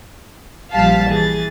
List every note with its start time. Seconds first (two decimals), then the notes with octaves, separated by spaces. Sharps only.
0.72 A#1 F3 G3 F5 A5 B6
1.08 E3 G#4 A6